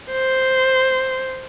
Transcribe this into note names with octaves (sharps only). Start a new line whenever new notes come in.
C5